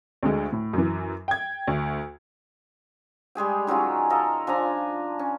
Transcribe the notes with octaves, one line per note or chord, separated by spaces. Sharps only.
D2 D3 G#3
A2
F#2 E3
G5 G#6
D2
G3 G#3 G#4 G5
D#3 F#3 C#4 F4
A4 A#4 D#5 F5
F3 D4 G#5 A#5
C#4